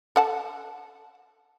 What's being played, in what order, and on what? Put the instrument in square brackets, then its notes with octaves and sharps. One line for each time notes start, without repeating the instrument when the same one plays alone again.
[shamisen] A4 F#5 A5